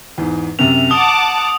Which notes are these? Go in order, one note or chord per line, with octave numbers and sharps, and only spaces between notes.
E2 G#2
F#2 C3 F7
F#5 A5 D6 D#6 G7